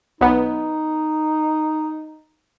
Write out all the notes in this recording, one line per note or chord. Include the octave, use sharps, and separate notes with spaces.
B1 B3 D#4